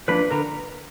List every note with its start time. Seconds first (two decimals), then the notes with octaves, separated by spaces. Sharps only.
0.08 F3 A#3 D4 B4 B5
0.31 D3 A#4 A#5